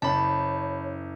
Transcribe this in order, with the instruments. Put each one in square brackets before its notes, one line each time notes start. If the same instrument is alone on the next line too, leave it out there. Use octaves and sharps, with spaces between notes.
[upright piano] F#1 [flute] C#5 [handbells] A5 B5